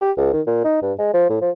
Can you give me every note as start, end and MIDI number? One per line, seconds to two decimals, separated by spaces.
0.01 0.11 67
0.17 0.31 37
0.33 0.41 51
0.47 0.61 46
0.64 0.80 63
0.82 0.93 43
0.98 1.10 56
1.13 1.28 53
1.30 1.39 45
1.41 1.51 53